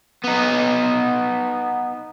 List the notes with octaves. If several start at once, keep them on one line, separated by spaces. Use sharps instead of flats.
B3 D#4